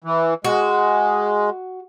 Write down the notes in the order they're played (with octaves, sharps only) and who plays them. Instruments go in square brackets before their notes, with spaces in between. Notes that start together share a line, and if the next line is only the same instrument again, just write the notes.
[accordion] E3
[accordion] G#3 [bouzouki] F#4